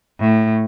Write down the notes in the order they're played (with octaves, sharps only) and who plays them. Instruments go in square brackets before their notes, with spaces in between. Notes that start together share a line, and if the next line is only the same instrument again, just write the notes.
[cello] A2